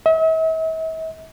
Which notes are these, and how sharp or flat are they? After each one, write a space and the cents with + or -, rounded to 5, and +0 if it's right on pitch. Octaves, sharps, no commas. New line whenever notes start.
E5 -45